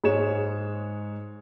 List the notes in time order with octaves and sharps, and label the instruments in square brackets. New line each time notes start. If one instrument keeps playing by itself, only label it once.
[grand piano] G#2 G#3 C#5 E7